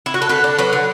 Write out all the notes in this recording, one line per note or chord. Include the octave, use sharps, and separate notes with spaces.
E4
F#4
A4
D3 B4
D4
F#3 B4
D3